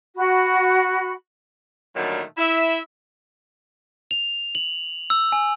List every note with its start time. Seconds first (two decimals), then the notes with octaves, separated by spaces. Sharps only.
0.17 F#4 B5
1.96 A#2 D3 D#3 F#3 G3 A3
2.38 E4 E5
4.11 F7
4.55 F#7
5.10 E6
5.32 G#5